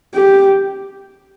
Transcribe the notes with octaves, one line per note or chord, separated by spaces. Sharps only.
G4